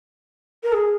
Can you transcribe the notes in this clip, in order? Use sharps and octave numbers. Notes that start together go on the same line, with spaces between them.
A#4
G#4